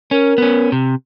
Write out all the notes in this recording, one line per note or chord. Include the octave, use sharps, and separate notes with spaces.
C#4 A#4
B3 C#4
C3